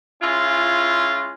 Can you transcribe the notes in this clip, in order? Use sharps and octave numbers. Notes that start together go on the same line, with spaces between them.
G#3 C#4 E4 F4